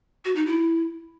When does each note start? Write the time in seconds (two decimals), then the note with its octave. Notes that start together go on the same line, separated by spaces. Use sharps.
0.25 F#4
0.36 D#4
0.46 E4